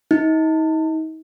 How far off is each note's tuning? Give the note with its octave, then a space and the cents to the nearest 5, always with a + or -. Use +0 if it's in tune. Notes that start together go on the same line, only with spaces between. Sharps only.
D#4 +35